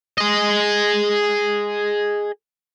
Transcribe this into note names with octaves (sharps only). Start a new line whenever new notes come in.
G#4 D#5